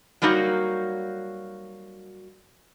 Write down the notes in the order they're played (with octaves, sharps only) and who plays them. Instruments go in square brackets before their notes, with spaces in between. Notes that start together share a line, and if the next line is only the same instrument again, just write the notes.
[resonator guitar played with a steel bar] F#3 G3 A#3 D#4 F#4